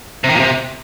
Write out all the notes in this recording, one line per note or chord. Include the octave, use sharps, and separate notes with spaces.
C3
D#3
A#2
C3